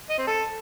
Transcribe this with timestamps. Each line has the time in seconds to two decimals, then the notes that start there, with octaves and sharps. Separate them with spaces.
0.10 D#5
0.18 C4
0.27 A4